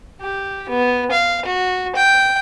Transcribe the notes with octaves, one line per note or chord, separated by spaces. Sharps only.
G4
B3
F5
F#4
G5